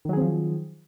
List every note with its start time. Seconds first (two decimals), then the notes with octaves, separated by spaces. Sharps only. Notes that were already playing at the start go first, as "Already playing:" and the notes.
0.05 D#3
0.09 F#3
0.13 G#4
0.17 C4
0.21 F3